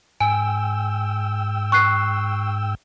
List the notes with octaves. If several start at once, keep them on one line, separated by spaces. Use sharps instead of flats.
G#2 G5 G#5 E6
C#6 F#6 C7